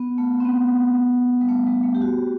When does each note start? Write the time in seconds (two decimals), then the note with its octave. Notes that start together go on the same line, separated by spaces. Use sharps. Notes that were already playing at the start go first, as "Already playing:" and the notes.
Already playing: B3
0.18 A3
0.40 C4
0.45 B3
1.41 G3
1.49 A3
1.67 G3
1.83 A3
1.95 G4
2.02 F#4